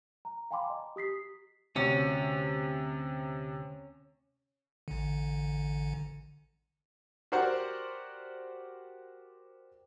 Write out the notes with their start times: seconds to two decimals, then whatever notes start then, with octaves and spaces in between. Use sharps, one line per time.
0.25 A#5
0.51 F5 G5 G#5 B5 C6 D6
0.66 D#5 A#5
0.96 G4 D#6 B6 C7
1.76 D2 C3 C#4
4.88 A1 D3
7.32 F#4 G4 A#4 C5 D5 F#5